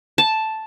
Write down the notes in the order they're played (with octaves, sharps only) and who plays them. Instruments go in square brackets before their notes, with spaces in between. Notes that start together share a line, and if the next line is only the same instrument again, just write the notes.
[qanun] A5